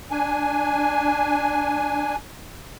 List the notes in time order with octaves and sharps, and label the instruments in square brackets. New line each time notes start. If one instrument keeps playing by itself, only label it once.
[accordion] D4 G#5